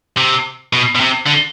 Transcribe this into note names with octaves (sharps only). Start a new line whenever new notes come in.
C3
B2
B2
C3
D3